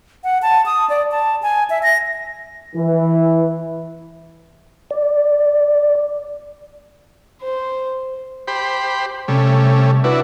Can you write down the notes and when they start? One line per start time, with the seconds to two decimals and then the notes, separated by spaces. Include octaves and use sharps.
0.24 F#5
0.42 A5
0.66 D#6
0.90 D5
1.11 A5
1.43 G#5
1.70 E5
1.83 A#6
2.75 E3
4.91 D5
7.43 C5
8.48 G4 C5 B5
9.28 C3 G3 A3 C#4
10.04 D4 E4 F#4 B4